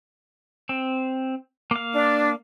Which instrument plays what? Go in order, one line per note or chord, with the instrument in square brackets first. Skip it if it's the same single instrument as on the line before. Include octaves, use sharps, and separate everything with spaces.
[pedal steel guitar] C4
A#3 F5
[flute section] D4